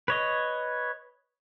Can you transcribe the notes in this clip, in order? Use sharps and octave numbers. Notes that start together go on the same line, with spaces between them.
B4 C#5 D#5